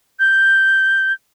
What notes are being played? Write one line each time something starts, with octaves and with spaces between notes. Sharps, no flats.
G6